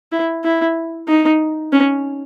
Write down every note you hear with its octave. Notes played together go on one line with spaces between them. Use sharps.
E4
E4
D#4
C#4